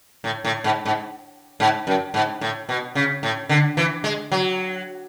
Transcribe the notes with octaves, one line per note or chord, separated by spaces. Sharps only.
A2
A2
G#2
G#2
G#2
F#2
G#2
A2
B2
C#3
A2
D3
E3
G#3
F#3